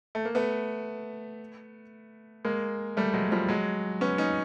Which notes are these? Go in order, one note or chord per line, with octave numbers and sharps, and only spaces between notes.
A3
A#3
A3 B3
G#3 A#3
G3 A3
F#3 G#3
F3 G3
F#3 G#3
B3 C#4
C#4 D#4